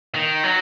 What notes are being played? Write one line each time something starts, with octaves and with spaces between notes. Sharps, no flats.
D#3
F#3